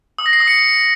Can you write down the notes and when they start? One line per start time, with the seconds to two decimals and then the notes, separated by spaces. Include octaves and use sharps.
0.18 D#6
0.26 A#6
0.33 C7
0.40 D#6
0.48 C#7